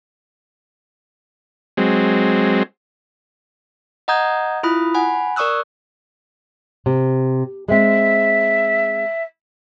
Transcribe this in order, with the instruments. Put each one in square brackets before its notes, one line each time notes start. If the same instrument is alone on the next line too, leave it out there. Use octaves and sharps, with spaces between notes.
[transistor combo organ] F#3 G#3 C4
[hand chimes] D#5 F#5 A#5 D#6 G6 G#6
E4 F4 B5 D#6
F#5 G#5 B5
A#4 D5 C#6 D#6 E6 F#6
[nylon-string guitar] C3
[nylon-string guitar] G#3 C4 [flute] E5